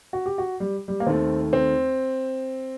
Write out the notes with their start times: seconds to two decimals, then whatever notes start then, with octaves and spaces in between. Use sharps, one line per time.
0.13 F#4
0.26 G4
0.38 F#4
0.60 G3
0.88 G3
1.00 A#3
1.06 D#2 D#3 A3 C4
1.53 C4